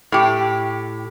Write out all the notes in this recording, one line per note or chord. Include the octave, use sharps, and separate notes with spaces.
A2 G4